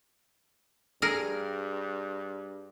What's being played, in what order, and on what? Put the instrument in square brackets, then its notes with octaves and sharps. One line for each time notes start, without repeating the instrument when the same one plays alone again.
[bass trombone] G2 [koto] G#4 A#4